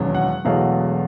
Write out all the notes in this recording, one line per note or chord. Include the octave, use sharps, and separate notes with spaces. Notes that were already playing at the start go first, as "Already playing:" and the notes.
Already playing: E1 D#2 C#3 F#3
F#5
E1 E2 B2 F#3 A3 F5